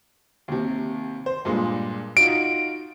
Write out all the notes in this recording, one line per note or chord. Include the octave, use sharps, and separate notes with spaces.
D#2 C3
C5
G2 A#2 G#3
D#4 F4 F#4 D7